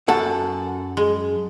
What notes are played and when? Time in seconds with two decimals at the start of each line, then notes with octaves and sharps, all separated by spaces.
0.08 F#2 A4 F#5
0.97 G#3